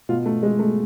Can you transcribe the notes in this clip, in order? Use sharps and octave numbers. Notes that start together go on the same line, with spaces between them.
B2 F4
A3
G#3
A3